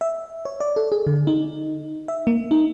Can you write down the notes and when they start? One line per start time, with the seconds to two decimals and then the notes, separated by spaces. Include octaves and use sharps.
0.01 E5
0.45 C#5
0.60 D5
0.76 A4
0.92 G#4
1.07 D3
1.27 D#4
2.08 E5
2.27 A#3
2.51 D#4